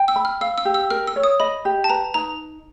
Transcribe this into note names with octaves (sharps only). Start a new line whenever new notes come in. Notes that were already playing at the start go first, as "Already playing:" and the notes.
Already playing: G5
E6
B5
F6
F5 E6
E6
G4
E6
A#4 F6
E6
C#5
D#6
D#5 B5
G4
A5
B4 A#5
D#4 A#5